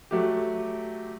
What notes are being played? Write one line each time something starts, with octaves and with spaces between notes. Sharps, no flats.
F#3 A3 F#4 G4